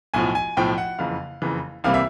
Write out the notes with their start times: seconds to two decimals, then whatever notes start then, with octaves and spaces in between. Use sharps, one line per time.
0.14 B1 A2 F3 G#5
0.35 G#5
0.57 B1 A2 F3 G5
0.78 F#5
0.99 F#1 F2 C#3 E3 F5
1.42 F#1 F2 C#3 E3
1.84 C2 C3 E3 G3 A#3 F5
1.94 E5